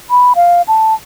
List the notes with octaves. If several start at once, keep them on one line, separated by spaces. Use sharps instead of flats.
B5
F5
A5